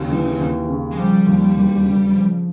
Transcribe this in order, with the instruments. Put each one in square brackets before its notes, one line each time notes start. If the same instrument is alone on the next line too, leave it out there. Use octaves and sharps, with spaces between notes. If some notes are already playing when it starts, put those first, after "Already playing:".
Already playing: [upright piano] D#2 [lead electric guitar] C#3
[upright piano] E3
D#2
C#3
[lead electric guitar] G#3
[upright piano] F3 [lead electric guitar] G3
[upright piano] D#2
E1
C#3
F3